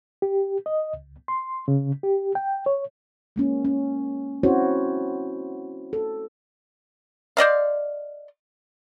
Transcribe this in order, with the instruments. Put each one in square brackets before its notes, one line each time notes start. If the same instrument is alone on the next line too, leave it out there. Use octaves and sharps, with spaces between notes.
[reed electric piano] G4
D#5
C#2
C6
C#3
G4
G5
C#5
[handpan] G#3 A#3 C#4
C#4
C4 C#4 E4 F#4 C5 C#5
A4
[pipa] C5 D5 D#5 F5